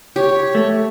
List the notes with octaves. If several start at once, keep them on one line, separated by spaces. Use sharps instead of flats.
G4 C#5
A3